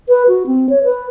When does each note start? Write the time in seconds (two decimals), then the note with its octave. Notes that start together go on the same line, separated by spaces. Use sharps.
0.08 B4
0.28 F#4
0.47 C4
0.69 C#5
0.84 B4